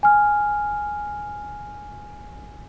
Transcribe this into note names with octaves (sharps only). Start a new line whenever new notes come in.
G#5 F6